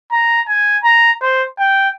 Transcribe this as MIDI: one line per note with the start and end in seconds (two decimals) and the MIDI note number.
0.12 0.41 82
0.48 0.78 80
0.84 1.12 82
1.22 1.45 72
1.59 1.89 79